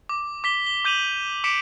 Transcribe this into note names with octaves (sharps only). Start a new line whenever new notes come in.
D6
D6 B6 G7
G7
D6 G6 D#7 F7 F#7
D6 B6 C#7 D7 E7